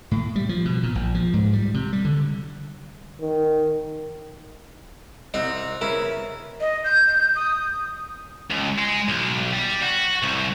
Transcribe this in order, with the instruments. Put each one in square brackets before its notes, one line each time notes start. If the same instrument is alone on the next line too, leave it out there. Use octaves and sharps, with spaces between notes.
[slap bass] A2
G3
F3
B2
A#2
A#1
F3
G#2
G3
C3
G3
D3
[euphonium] D#3
[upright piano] C2 [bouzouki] C4 A#4 F#5 [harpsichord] D#4
[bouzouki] C#3 B3 [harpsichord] E4 [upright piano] A#4
[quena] D#5
G6
D#6
[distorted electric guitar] C#2
G#3
B1
G3
F#4
C2